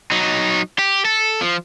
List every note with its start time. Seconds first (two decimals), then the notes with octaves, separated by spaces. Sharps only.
0.11 F#3 D#4
0.79 G4
1.05 A4
1.41 F3